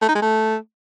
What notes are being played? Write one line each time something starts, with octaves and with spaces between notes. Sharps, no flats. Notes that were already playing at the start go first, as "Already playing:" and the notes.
A3
D#4
G#3
A3